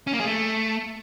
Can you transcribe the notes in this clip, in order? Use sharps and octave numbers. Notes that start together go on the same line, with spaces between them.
C#4
A#3
G#4
A3